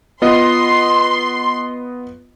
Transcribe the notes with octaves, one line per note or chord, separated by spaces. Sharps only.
B3 F4 D#5 C6